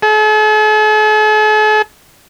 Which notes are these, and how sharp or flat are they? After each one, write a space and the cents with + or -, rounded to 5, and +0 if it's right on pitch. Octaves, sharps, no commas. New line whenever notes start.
A4 -45